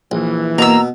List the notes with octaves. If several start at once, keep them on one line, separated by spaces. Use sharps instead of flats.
A#1 E3
B2 A#3 A#5 E6